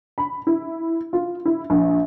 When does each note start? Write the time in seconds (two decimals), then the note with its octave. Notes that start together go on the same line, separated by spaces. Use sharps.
0.18 B5
0.47 E4
1.13 F4
1.45 E4
1.70 A#1